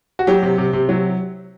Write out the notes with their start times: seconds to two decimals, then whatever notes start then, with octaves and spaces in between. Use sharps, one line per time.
0.19 F#4
0.27 F#3 G4
0.43 C3
0.58 C3
0.73 C3
0.89 F#3